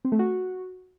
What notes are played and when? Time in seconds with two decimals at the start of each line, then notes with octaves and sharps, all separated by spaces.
0.05 C4
0.12 A3
0.19 F#4